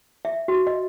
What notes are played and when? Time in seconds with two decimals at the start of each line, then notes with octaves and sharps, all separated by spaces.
0.25 E5
0.48 F#4
0.67 D#5